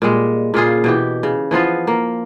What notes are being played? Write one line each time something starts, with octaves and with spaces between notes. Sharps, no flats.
A#2 G3 G#3
A#2 C#3 F4 G#4
B2 E3 G4
C#3
E3 F3 B3 F4
A#3